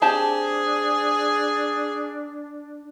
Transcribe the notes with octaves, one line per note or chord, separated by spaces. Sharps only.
C4 D4 G4 G#4 A5